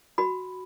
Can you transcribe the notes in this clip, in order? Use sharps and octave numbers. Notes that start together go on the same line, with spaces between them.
F#4 B5